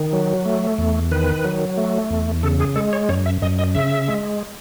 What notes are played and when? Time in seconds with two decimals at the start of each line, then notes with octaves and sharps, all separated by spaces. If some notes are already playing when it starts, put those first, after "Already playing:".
Already playing: D#3
0.13 F#3
0.46 A3
0.78 E2
1.11 D#3 B4
1.44 F#3
1.77 A3
2.10 E2
2.43 C#3 A4
2.60 G#4
2.76 G#3 A4
2.93 C#5
3.09 F#2 C#5
3.26 E5
3.42 F#2 D#5
3.59 D#5
3.75 C#3 E5
4.08 G#3